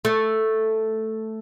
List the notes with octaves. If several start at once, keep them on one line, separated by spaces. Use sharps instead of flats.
A3